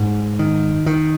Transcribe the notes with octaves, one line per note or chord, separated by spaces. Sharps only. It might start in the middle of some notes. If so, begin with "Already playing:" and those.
Already playing: G#2
D#3
D#3